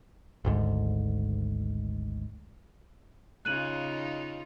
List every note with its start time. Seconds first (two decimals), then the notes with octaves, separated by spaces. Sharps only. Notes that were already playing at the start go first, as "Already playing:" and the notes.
0.45 G#1 D2 G#2
3.45 C#3 D#4 F4 F#6 D#7 F#7